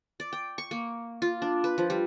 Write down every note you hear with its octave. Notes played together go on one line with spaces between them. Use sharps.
D5
G5
C#6
A#3
F4
D4
B4
F3
G3